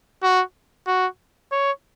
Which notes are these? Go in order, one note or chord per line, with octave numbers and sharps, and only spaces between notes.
F#4
F#4
C#5